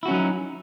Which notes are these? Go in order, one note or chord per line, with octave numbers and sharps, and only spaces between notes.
F#3 C#4 D#4 E4 F#4